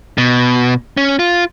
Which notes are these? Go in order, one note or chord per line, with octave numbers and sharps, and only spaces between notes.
B2
C#4
F4